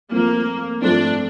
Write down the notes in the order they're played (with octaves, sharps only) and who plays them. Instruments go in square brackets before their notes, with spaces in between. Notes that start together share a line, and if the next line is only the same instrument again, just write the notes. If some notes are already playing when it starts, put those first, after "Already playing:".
[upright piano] F3 A3 C4 [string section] A#3
[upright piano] F3 A3 C4 [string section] D4